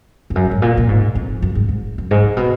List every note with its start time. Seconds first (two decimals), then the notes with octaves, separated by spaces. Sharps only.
0.30 F2
0.35 F#2
0.51 G#2
0.62 A#2
0.77 A#2
0.89 G#2
1.15 F2
1.42 F#2
1.55 G#2
1.69 G#2
1.98 F#2
2.11 G#2
2.24 A#2
2.37 B2